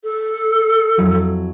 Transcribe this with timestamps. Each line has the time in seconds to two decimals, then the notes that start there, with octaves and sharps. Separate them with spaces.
0.04 A4
0.97 F2 F#3 E4